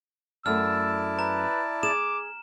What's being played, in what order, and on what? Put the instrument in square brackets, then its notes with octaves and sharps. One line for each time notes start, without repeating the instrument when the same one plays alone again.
[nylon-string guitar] F#2 A3 [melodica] E4 D5 A5 [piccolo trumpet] E6 [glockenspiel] F6
[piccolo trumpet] B4 [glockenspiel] A#5
[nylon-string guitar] G#4 [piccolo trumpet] D6 [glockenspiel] E7